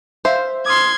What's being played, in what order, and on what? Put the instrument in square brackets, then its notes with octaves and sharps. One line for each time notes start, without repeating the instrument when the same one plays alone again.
[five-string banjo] C5 [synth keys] E5 F5
[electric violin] C6 G#6 [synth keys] D6 D#6 F6